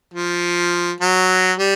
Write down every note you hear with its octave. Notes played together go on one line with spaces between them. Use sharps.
F3
F#3
G3